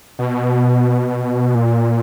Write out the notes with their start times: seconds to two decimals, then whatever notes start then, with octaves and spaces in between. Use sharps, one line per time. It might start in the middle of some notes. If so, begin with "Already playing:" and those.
0.19 B2
1.55 A#2